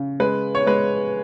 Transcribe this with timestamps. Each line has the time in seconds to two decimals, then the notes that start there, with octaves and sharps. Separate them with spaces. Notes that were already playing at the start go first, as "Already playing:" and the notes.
Already playing: C#3
0.20 G#3 B4
0.55 C#5
0.67 G#3 B4